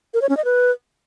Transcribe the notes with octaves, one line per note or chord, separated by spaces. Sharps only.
A#4
C#5
C#4
D#5
B4